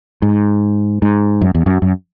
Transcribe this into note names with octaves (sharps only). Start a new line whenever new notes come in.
G#2
G#2
F#2
E2
F#2
F#2